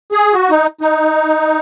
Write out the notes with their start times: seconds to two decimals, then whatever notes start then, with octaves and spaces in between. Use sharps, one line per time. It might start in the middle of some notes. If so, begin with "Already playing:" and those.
0.12 G#4
0.34 F#4
0.50 D#4
0.81 D#4